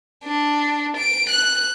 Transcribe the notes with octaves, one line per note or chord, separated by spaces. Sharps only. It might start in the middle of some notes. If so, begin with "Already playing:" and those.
D4
D7
F#6